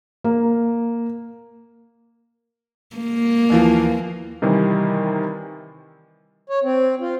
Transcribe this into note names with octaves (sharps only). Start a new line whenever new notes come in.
A#3
A#3
D#2 E3 F3
C3 D#3 E3 G3
C#5
C4
F4